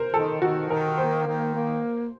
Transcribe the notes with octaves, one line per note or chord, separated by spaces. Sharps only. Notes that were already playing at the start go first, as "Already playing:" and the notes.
Already playing: A#4 C5
D#3 A4
D#3 F#4
D#3 A#4
A#3 C5
D#3
A#3